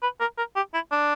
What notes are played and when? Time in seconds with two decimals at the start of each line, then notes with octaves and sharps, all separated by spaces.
0.03 B4
0.20 A#4
0.38 A#4
0.56 G4
0.74 E4
0.92 D4